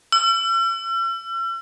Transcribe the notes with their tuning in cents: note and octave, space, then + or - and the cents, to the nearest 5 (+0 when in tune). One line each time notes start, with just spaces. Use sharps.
E6 +45